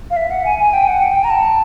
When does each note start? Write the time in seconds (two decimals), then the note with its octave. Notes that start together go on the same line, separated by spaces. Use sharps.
0.11 F5
0.17 E5
0.31 F#5
0.45 G#5
0.59 G#5
0.73 G5
0.88 F#5
1.02 G5
1.24 A#5
1.30 A5